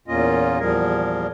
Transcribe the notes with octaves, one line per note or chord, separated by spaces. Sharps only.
E2 A#2 A#3 C#4 F4 D#5
E2 A#2 F3 G3 G#4 A#4